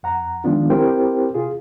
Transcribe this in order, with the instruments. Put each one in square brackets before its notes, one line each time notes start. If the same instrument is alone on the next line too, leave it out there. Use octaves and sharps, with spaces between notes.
[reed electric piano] F2 F#5 A#5
D#3 F3 G#3 B3 D4 F4
C4 E4 G4 A#4 C5 G5
C3 F4 G#4